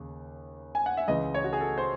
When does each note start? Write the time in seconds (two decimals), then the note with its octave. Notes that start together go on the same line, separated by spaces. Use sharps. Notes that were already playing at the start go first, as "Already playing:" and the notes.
Already playing: D#2 C#3
0.75 G#5
0.86 F#5
0.97 E5
1.08 C#2 C#3 E3 D#5
1.34 C#5
1.44 F#4
1.53 G#4
1.61 A4
1.78 C5